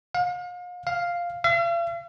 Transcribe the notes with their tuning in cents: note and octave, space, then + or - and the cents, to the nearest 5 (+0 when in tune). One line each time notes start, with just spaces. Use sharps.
F5 +40
F5 +0
F5 -45